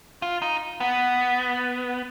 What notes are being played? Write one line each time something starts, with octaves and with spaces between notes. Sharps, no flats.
F4
D#4
B3